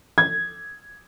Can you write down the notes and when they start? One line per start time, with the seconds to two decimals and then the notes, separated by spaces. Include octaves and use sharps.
0.18 G#6